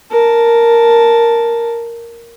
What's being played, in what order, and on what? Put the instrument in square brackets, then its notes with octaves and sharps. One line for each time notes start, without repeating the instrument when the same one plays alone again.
[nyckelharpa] A#4 A5